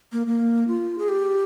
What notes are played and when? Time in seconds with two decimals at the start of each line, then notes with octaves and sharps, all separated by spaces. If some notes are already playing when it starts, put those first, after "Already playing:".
0.12 A#3
0.27 A#3
0.68 F4
0.98 G#4
1.09 G4